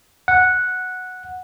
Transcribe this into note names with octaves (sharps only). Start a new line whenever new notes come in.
F#5